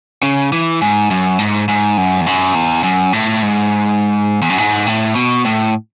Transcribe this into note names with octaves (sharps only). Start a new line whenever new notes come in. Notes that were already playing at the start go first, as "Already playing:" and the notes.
C#3
E3
G#2
F#2
G#2
G#2
F#2
E2
F#2
E2
F#2
A2
G#2
E2
F#2
G#2
A2
B2
A2